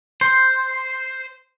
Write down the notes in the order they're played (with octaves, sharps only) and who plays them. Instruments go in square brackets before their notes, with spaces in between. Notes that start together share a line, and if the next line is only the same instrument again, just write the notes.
[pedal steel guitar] C5